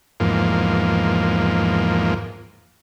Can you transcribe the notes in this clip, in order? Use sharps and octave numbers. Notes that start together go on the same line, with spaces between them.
E2 G#2 F3 A#3